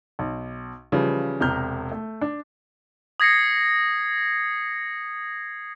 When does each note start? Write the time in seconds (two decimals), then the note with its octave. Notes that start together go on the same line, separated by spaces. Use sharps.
0.19 B1
0.92 C#3 E3 F3 G3
1.40 E1 C3 A#5 F6 G6
1.91 A3
2.21 D4
3.20 D#6 G#6 A#6 C7 C#7